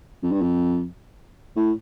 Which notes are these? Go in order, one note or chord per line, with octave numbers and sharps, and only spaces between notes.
F2
G2
F2
A2